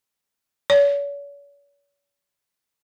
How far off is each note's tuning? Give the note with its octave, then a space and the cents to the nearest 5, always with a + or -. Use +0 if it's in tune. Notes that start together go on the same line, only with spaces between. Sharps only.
C#5 +40